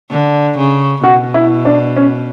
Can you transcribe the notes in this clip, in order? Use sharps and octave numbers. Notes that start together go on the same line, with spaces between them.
D3
C#3
B2 F#4
E4
D4
C#4